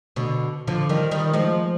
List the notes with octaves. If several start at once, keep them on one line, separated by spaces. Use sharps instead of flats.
B2 D3
D3 F3
D#3 G3
D#3 G3
F3 G#3